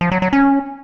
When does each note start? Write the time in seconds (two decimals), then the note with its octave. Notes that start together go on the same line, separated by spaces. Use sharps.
0.01 F3
0.12 F#3
0.22 F#3
0.33 C#4